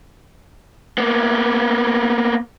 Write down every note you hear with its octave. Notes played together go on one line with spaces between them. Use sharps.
A#3 B3